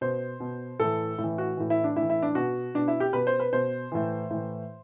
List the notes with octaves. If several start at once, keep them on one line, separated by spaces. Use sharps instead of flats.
B2 C5
B2
A2 E3 A4
A2 E3
F#4
A2 E3
E4
D4
A2 E4
E3
E4
D4
B2 F#4
B2 D4
E4
G4
B2 B4
C5
B4
B2 C5
A2 E3
A2 E3